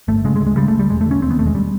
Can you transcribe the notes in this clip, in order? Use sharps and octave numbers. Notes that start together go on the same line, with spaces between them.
G1 A3
C#3 G#3
G#3
D2
G#3
C#3 G3
A3
D2
G3
E1 G#3
A3
D3 C#4
D#2 C4
B3
E1 A3
G#3
G3